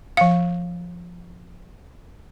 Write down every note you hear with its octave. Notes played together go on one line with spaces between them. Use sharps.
F3 F5